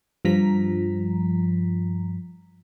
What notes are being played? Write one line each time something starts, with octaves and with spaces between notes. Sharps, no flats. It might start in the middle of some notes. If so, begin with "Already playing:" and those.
G2 F3 A#5 B6